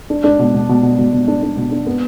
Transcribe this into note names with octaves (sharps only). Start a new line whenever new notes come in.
D4
D4
B2
B2
B2
B2
B2
B2
D4
D4
B2
D4
B3